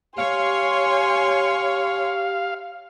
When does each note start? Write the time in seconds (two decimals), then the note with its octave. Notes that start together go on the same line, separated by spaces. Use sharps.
0.18 G4 C#5 F5 G#5 C6